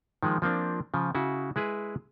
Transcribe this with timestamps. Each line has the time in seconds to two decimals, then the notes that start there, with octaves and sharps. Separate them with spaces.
0.23 D#3 F3 G#3
0.42 F3 A#3 C4 D4
0.94 C#3 F3
1.15 C#3 E4 F#4
1.56 G#3 E4 G#4 B4